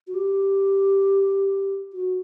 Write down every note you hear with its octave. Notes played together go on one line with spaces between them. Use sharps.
F#4
G4
F#4